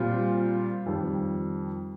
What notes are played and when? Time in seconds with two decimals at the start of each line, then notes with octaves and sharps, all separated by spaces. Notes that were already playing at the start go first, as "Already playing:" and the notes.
Already playing: A#2 G3 C4 F4
0.86 F2 D#3 G3